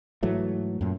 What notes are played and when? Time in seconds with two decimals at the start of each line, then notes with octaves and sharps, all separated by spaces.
0.23 G#2 E3 F#3 A3
0.81 F#2 A#2